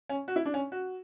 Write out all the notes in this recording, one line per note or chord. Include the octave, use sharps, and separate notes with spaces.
C#4
F#4
E4
D4
C#4
F#4